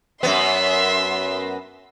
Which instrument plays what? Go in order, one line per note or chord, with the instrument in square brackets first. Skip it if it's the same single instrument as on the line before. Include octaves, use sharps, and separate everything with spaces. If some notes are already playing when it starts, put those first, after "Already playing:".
[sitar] F#2 B3 [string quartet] E5 C6